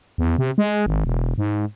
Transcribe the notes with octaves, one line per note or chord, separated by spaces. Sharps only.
E2
C3
G#3
G#1
E1
G#2